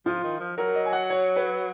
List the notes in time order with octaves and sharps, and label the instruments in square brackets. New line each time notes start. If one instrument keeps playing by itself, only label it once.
[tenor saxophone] F3 [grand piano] F4
[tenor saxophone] D#3
F3
[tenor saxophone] F#3 [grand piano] A#4
[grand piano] D#5
G#5
F#5
C#5
B4